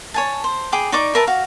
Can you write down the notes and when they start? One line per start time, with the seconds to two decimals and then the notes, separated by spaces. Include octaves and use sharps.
0.14 C#5 G#5 A5
0.44 C5
0.72 G#4 G5 B5 D6
0.92 D#4 D5 C#6 D6
1.15 A#4 B4 E5 A5
1.27 F#4 F5